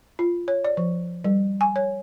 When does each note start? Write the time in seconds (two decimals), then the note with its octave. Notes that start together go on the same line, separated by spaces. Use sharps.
0.19 F4
0.48 C#5
0.64 D5
0.77 F3
1.24 G3
1.61 G#5
1.76 C#5